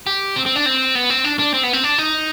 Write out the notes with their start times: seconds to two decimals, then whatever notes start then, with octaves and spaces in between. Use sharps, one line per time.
0.07 G4
0.36 C4
0.46 C4
0.56 D4
0.66 C4
0.95 B3
1.10 C4
1.24 D4
1.39 D4
1.54 C4
1.63 B3
1.73 C4
1.84 D4
1.98 D#4